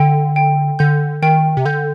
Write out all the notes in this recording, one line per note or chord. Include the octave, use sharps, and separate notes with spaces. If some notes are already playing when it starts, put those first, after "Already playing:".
Already playing: D3 G5
G5
D3 G6
D#3 G5
C3
D3 G6